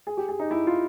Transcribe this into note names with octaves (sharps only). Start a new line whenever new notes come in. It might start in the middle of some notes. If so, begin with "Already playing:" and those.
G#4
G4
G#4
D#4
E4
F4